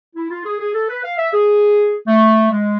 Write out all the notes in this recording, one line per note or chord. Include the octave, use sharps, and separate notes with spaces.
E4
F4
G#4
G#4
A4
B4
F5
E5
G#4
A3
G#3